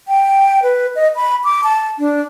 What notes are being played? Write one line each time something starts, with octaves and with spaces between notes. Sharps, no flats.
G5
B4
D#5
B5
D6
A5
D4